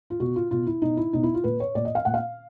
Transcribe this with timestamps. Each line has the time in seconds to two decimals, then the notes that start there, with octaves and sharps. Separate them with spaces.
0.10 F4
0.20 B2 F#4
0.36 F4
0.51 B2 F4
0.67 E4
0.82 B2 D#4
0.97 E4
1.13 B2 D#4
1.23 E4
1.34 F4
1.44 A#2 B4
1.60 C#5
1.75 A#2 D5
1.85 D#5
1.95 F5
2.05 A#2 F#5
2.14 F5